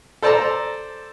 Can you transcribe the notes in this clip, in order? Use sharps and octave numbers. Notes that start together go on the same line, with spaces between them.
A4 C5 D5 A5 A#5